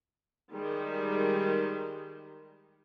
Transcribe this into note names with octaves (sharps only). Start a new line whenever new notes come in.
D#3 G3 G#3